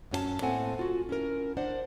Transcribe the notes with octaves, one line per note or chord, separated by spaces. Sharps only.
F#2 F#3 C#4 G#4 A5
A2 A#3 C4 A4 F#5 G#5
F4 F#4
C#4 E4 A#4
D4 C5 D5 F#5